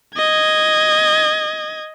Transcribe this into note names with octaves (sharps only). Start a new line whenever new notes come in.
D#5 G#6